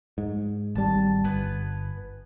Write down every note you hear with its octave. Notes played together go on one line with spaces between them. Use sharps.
G#2
G#1 G3 A5
G1 B3 B4 G#5